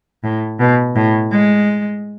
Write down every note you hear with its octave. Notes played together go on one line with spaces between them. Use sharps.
A2
B2
A2
G#3